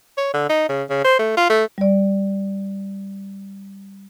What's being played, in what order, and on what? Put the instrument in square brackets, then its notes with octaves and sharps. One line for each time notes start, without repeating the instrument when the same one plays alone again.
[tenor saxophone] C#5
D3
D#4
C#3
C#3
C5
A3
F4
A3
[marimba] G3 D5